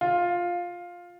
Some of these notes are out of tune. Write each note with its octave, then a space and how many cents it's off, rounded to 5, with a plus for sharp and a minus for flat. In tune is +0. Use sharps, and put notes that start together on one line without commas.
F4 +10